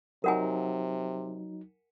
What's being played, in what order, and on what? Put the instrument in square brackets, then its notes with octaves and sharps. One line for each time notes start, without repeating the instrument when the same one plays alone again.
[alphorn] C3 [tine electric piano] F#3 D#4 [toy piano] A#4 F#5 G#5